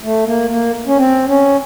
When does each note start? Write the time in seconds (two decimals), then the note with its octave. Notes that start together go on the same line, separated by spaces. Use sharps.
0.03 A3
0.27 A#3
0.51 A#3
0.87 C#4
0.97 C4
1.29 C#4